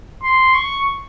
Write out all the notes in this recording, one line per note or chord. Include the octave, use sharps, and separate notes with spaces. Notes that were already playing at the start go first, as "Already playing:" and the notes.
C6
C#6